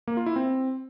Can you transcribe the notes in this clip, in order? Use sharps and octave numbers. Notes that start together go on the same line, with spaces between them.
A#3
F4
E4
C4